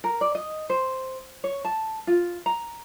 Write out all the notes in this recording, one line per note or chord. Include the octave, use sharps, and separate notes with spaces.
A#4
D5
D#5
C5
C#5
A5
F4
A#5